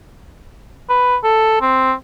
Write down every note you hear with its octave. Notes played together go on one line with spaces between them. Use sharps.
B4
A4
C4